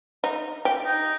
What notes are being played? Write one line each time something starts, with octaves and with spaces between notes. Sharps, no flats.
D#4
G4
D#4